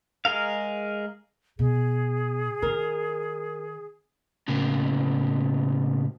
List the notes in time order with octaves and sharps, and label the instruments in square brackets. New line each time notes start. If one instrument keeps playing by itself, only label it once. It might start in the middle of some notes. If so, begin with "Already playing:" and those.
[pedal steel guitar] G#3 G#4 A#4 F5
[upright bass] B2 [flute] G#4
[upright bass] D#3 [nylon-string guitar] A#4
[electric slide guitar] A2 C#3 A#3